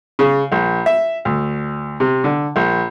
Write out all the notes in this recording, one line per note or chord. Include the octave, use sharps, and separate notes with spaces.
C#3
A#1
E5
D2
C3
D3
A#1